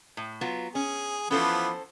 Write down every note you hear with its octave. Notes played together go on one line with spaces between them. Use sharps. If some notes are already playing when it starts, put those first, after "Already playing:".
A2
F#3 B3 F4
C#4 G#4
E3 F3 B3 C#4 A4 C5